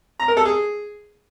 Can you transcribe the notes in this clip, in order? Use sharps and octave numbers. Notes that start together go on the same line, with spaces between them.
A#5
A#4
A4
G#4